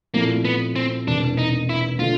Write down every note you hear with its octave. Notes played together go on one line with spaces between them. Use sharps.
A#2 F3 A3 A#3 C4 E4
B3
C4
E1 E2 C3 E3 D4
D#4
E4
D3 F4